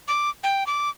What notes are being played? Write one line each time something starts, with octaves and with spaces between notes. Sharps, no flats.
D6
G5
D6